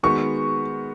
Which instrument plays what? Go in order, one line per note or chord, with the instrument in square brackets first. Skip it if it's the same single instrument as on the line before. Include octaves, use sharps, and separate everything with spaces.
[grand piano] D#3 G#3 B3 F#4 B4 [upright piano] C#6